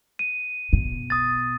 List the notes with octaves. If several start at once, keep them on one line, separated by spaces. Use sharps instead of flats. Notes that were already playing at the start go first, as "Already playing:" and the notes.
D#7
B2
D#6 A6